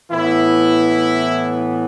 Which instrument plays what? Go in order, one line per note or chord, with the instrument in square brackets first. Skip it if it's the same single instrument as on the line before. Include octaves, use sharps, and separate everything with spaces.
[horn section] A2 E3 B3 E4